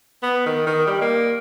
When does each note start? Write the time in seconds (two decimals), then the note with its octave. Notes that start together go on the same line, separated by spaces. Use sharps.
0.23 B3
0.46 D#3
0.66 D#3
0.87 G3
1.02 A#3